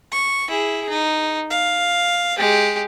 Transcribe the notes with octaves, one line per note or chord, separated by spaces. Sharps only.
C#6
E4 G#4
D#4
F5
G#3 G4